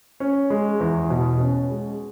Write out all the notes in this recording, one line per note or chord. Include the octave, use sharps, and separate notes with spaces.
C#4
G#3
E2
B2
C#4
G#3